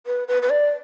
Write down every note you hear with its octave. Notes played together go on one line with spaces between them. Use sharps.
B4
B4
B4
D5